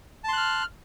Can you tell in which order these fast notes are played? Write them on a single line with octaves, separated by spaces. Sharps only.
A5 C6 F#6 F6